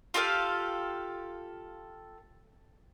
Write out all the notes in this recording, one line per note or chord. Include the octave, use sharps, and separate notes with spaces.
F4 G4 A4 F5